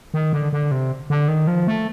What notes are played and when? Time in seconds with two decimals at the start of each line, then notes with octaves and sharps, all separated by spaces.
0.14 D#3
0.33 D3
0.53 D3
0.71 C3
1.10 D3
1.28 D#3
1.47 F3
1.67 A3